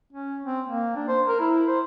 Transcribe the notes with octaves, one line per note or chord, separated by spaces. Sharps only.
C#4
C4
A#3
D4
C5
A#4
E4
C5